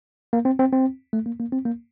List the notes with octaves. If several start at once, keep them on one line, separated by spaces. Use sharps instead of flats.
A#3
C4
C4
C4
A3
A#3
A#3
C4
A#3